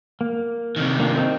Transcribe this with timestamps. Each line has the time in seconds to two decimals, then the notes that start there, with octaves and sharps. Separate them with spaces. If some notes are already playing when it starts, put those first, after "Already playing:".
0.21 A#3
0.76 C3 D#3
1.00 A#3 D4 F4
1.17 A#3 C4 D#4